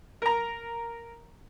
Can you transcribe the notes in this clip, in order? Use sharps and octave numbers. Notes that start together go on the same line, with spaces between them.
A#4 A#5